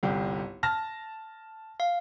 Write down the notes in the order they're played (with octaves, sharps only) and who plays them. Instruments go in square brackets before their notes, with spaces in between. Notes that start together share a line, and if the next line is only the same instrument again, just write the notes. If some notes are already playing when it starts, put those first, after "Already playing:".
[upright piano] G1 C2 G4
A5 F6 A#6
[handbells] F5